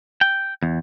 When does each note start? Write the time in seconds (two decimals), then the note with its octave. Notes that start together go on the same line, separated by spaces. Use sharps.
0.21 G5
0.63 E2